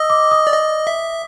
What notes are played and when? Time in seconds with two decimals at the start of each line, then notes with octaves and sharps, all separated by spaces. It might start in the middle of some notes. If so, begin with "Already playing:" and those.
Already playing: D#5 D#6 E6
0.10 D6
0.31 D#6
0.47 D5
0.53 D#5
0.87 E5